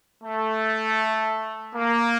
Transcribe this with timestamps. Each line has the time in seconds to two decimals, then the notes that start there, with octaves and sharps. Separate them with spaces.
0.24 A3
1.75 A#3